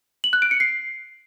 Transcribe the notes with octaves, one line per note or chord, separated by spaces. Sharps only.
F#7
F#6
D7
C#7
C7